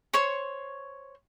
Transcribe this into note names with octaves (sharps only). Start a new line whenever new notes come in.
C5 C#5 C#6